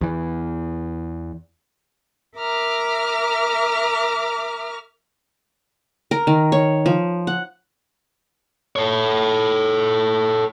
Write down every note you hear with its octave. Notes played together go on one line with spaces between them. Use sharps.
E2 E3
A#4 E5 A#5 D6 F6
A#4
D#3
C#5
F3
F#5
A4 C#5